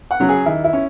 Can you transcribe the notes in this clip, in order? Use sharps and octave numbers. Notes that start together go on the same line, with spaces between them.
F#5
C#3 F#3 C#4
G#4
D#2 E4
E4
C#4